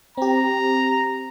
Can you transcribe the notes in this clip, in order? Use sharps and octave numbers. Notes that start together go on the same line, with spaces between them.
C4 G4 A#5